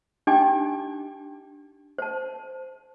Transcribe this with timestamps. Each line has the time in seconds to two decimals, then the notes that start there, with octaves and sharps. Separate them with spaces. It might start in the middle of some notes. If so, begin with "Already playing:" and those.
0.27 D4 D#4 G4 G5 G#5 D6
1.98 C5 A5